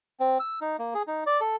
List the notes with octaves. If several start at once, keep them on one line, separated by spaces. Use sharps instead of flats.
C4
E6
D#4
A#3
G#4
D#4
D5
A4